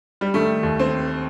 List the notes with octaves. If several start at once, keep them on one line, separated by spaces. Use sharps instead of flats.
G3
D#3 A3
D#2
C4